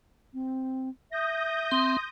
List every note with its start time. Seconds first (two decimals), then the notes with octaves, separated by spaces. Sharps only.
0.33 C4
1.11 E5 D#6 G6 A#6
1.71 C4 C6